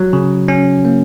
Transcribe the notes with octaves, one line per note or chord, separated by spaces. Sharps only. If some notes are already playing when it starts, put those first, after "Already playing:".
Already playing: F#3
C#3
C#4
A#3